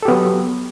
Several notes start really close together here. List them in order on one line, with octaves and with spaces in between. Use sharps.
A4 G4 B3 F#3